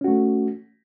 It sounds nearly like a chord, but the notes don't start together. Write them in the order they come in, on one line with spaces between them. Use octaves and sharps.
C#4 F#4 A3